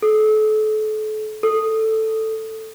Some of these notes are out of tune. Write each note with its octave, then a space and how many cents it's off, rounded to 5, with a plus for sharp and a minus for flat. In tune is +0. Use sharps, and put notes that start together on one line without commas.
A4 -35
A4 +5